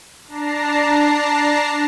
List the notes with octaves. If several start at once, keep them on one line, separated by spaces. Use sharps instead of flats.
D4 A5 A#5 A#6 C7